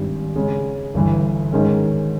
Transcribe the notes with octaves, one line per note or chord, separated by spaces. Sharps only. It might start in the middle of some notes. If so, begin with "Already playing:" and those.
Already playing: G#1 G2 G3
C#3 G#3 C#4
G1 G2 E3
G#2 D#3 G#3 C#4